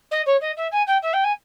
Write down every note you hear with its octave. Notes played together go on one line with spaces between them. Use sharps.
D#5
C#5
D#5
E5
G#5
G5
E5
G5
G#5